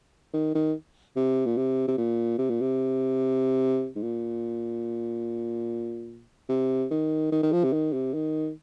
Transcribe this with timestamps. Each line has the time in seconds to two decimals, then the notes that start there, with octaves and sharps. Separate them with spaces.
0.33 D#3
0.55 D#3
1.16 C3
1.46 A#2
1.57 C3
1.88 C3
1.98 A#2
2.38 C3
2.50 A#2
2.61 C3
3.96 G#2
4.03 A#2
6.49 C3
6.91 D#3
7.32 D#3
7.43 D#3
7.52 F3
7.64 C3
7.73 D#3
7.93 C3
8.14 D#3